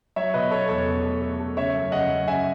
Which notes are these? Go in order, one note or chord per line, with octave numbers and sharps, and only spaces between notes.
F#3 C#5 E5
B2 B4 D#5
B2 A4 C#5
E2 A4 C#5
B2
A3
A3
A3
C#3 C#5 E5
F#2
C#3 D#5 F#5
F#2
C#3 E5 G#5